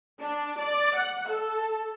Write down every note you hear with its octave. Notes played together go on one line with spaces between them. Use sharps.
D4
D5
F#5
A4